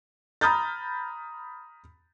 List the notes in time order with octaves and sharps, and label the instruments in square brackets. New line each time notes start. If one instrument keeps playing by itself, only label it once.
[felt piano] A#5 B5 D#6 F6 G6 A6